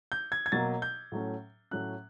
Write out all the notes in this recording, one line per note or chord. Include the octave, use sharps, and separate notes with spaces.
G6
G#6
G#6
B2 F#3 A#3 A6
G6
A2 F#3 A3 C#4
A2 F#3 A3 C#4 F#6